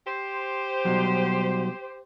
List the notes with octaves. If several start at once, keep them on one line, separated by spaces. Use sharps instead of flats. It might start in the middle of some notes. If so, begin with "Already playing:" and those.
G4 C5
B2 F#3 G3